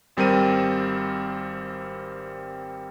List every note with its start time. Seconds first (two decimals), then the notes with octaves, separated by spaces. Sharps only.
0.17 G#1 G3 C4 A#4 D#7